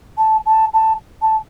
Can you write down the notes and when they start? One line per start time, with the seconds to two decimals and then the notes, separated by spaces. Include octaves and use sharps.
0.17 A5
0.46 A5
0.73 A5
1.21 A5